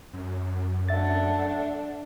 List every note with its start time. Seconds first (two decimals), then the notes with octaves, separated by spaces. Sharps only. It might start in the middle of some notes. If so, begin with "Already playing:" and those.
0.13 F#2
0.89 A3 D4 E5 F#5 A6